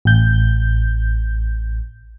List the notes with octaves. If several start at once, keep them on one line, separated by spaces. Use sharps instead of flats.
A1 G6